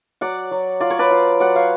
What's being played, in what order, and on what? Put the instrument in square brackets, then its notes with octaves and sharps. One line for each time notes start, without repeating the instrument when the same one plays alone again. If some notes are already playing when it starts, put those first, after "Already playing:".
[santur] F#3 D5 F#5
F#3
F4 D5
C#5
B4 D5
F4
F#3 D5 F#5
C#5 F5